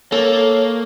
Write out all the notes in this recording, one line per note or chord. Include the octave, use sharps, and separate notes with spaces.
A#3 A4 C#5